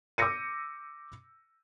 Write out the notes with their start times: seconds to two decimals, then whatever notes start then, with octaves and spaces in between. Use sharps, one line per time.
0.18 D6 E6 G6 A#6 C#7 D#7